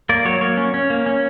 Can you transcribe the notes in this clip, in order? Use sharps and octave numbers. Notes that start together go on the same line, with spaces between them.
A#3 D5
F#3 C#5
A#3 C#5
C#4
C#4
A#3
C#4